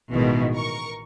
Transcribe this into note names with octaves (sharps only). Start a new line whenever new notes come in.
A1 B2 D#3 E3 G#3
A#4 C#6